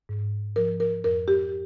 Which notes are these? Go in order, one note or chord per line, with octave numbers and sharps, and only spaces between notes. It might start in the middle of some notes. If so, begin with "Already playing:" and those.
G#2
F3 A#4
A#4
F2 A#4
G4